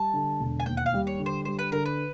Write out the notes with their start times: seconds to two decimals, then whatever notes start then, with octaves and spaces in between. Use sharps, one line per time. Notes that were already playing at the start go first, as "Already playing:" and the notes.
Already playing: G3 A5
0.13 D3
0.40 E1
0.60 G#5
0.66 D#2 G5
0.77 F#5
0.86 F5
0.94 G3
1.07 C#5
1.19 D3
1.26 C5
1.45 G3 C5
1.59 B4
1.72 D3 A#4
1.85 B4